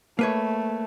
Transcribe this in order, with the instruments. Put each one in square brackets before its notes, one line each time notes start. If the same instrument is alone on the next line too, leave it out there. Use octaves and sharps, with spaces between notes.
[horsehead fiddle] A3 [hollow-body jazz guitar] A#3 B4 C#5